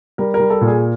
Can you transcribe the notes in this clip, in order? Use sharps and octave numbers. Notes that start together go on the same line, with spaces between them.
G3 A#4
A#4
G3
A4
A#2
G#4